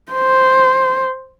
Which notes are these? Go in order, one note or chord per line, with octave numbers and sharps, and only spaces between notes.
C5